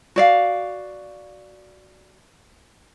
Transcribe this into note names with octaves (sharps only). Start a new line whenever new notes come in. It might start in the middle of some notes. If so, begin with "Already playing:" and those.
F#4 D5 F5